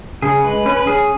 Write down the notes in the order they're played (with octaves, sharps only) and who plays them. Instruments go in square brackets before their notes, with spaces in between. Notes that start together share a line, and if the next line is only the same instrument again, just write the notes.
[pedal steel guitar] C#3 G#4
G#3 B4
C#4 B4
B4
C#4 G#4